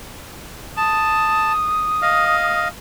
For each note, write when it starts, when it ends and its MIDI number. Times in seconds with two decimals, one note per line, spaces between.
0.77 1.53 81
0.77 2.60 87
2.02 2.68 75
2.02 2.68 77